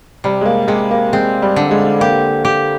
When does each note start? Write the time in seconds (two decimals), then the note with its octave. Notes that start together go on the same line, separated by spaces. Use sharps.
0.24 C3 G3
0.41 G#3
0.45 A#3
0.68 C3 G#3
0.91 A#3
1.12 G#3 C4
1.42 G3
1.56 D3
1.71 G#3
2.00 A#3 G4
2.45 G4